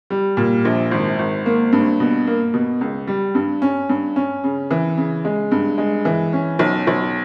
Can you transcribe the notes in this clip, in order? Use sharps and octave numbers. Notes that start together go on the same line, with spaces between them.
G3
A#2
A#1
G#1
G#1
A#3
G2
B2
A#3
B2
C#2
G3
G2
C#4
G2
C#4
C#3
E3
C#3
G#3
G2
G#3
E3
C#4
B1
B1